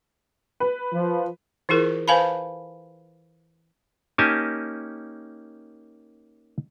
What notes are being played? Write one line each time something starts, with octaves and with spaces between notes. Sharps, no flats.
B4
F3
E3 E4 F4 G#4 A#4
B4 C5 F5 G#5 A5 B5
A#3 C#4 D#4 G4 G#5 A5